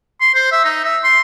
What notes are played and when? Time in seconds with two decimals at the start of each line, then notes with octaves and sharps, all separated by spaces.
0.21 C6
0.35 C5
0.52 E5
0.64 D#4
0.85 E5
1.04 C6